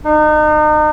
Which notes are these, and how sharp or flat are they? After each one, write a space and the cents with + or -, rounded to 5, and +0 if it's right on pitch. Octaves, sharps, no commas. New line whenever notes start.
D#4 -35